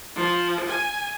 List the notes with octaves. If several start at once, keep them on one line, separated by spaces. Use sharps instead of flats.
F3
G#5